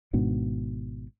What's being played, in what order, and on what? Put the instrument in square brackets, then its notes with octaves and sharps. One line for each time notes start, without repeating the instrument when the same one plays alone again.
[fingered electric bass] G#1 G#2 B2 D4